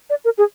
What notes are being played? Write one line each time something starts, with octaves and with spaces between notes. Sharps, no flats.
D5
A#4
G#4